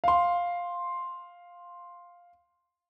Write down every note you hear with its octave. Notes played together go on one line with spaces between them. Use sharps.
F5 C6